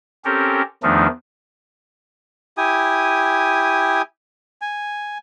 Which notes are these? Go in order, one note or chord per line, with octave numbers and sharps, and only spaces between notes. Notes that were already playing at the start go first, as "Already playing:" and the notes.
C4 C#4 G4 A4 A#4
E2 D#3 F3 A3 D4 D#4
E4 G4 G#5 D#6
G#5